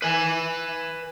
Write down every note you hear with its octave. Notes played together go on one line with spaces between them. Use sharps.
B4 G#5